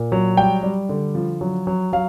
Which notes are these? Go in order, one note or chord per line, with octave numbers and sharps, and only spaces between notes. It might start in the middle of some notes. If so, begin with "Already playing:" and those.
Already playing: A#2
F#3
G3 G5
G3
D3
F3
F#3
F#3
F#3 F5